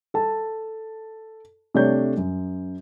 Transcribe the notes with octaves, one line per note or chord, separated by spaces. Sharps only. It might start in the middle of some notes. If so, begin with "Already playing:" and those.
A4 A5
C3 A3 D4 C#5 G6
F#2